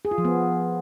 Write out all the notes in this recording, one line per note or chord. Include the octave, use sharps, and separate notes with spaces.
G#4
F4
F3
B3